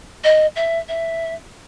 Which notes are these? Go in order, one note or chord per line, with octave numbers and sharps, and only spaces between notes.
D#5
E5
E5